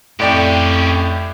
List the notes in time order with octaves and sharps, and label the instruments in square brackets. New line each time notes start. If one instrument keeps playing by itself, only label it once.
[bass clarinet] F2 [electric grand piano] A2 D5 G5 [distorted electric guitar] C#4 G4